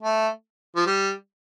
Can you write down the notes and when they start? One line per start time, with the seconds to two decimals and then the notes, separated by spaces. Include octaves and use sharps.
0.03 A3
0.76 F3
0.86 G3